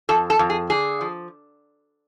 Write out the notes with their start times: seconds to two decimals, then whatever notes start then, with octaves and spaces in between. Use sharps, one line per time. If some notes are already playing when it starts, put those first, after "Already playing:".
0.09 F2 A4
0.30 A4
0.39 F2
0.50 G#4
0.70 D3 G#4
1.01 F3